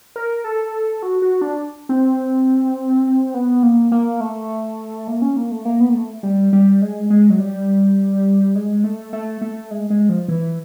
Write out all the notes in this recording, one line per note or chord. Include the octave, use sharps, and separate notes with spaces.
A#4
A4
F#4
F#4
D4
C4
B3
A#3
A#3
A3
A#3
C#4
A#3
A3
A#3
B3
A#3
A3
G3
G3
G#3
G#3
F#3
G3
G#3
A3
A3
A3
G#3
G#3
F3
E3